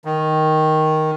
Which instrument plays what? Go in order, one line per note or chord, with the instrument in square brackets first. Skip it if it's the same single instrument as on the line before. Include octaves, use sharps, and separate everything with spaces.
[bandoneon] D#3